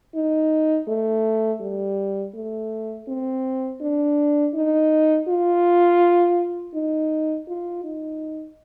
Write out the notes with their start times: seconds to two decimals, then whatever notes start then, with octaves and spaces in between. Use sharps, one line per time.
0.15 D#4
0.88 A3
1.61 G3
2.35 A3
3.08 C4
3.81 D4
4.55 D#4
5.28 F4
6.74 D#4
7.48 F4
7.84 D#4